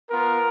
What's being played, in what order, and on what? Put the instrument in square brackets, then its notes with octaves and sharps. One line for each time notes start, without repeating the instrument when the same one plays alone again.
[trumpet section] B3 F4 A#4